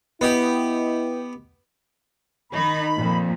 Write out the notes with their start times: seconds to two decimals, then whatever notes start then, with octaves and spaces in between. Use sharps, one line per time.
0.21 B3 E4 G4 B4 D#5 G5
2.52 D#3 D#4 B5
2.95 F2 A#2